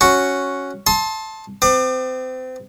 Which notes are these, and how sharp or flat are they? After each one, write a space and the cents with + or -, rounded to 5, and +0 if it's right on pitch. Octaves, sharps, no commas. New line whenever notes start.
C#4 +0 F#4 +0
A5 +0 C6 +25 D#6 +45
C4 -30 D6 +35